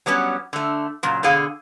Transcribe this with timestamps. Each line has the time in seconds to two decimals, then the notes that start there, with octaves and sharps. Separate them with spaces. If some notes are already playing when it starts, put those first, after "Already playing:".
0.06 F#3 G3 B3 C#4
0.53 D3 A3
1.03 A#2 C#3 F#3
1.23 B2 D3 G#4 F5